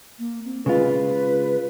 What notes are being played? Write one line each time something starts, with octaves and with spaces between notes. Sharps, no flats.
A#3
C4
C#3 G#3 F4 B4